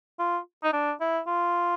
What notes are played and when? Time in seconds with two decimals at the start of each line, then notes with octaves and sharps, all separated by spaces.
0.19 F4
0.64 D#4
0.73 D4
1.01 E4
1.27 F4